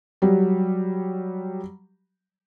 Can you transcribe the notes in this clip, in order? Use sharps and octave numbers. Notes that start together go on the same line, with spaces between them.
F#3 G3